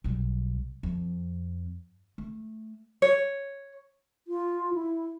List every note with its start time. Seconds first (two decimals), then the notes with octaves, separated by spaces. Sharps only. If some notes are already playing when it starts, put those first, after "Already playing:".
0.04 B1 G3
0.83 F2
2.18 A3
3.02 C#5
4.28 F4
4.74 E4